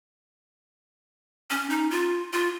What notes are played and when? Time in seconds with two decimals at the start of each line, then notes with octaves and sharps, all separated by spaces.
1.51 C#4
1.70 D#4
1.90 F4
2.33 F4